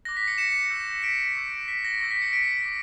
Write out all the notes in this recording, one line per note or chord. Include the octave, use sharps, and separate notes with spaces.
D6 F#6 A#6
B6
A#6 C#7
C#7 E7
C#6 E6 G6
B6 D7
C#6 E6 G6
B6
A#6
C#6 E6 G6 A#6
B6
A#6 C#7
B6 D7
D6